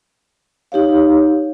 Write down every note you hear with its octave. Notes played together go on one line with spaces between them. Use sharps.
D#4 G4 C#5 F5